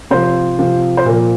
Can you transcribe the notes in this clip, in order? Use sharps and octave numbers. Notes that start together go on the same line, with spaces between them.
C3 F3 C5
C3 F3
C5
A#2 F3 A#4